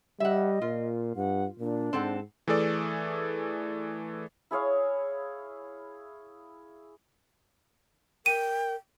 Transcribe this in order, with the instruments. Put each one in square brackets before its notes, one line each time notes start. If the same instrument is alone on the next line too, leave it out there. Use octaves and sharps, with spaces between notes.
[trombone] G3 [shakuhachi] D#5 [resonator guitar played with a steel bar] E5 F#5
[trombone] A#2 [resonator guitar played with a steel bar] F4
[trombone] G2 [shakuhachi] F#5
[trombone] A#2 [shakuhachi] D4
[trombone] G#2 [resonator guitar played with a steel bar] C4 A4 F#5
[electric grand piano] E3 A3 G#4 A4 D5
[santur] E4 G#4 C#5 F5
[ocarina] A#4 [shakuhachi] G5 [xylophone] D#7